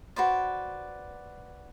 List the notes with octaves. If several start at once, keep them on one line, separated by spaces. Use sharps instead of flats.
F#4 B4 C5 D5